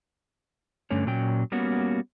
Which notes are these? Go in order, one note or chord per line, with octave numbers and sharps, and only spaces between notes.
G2 D3 A3 C#4 C#5
A#2 F#3 C#4 G5
G3 A#3 B3 C#4 F#4